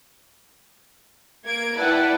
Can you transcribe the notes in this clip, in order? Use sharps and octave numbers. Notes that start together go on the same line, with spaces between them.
A#3 G#6 D7
E4 B4 D5 F#5 G5 A5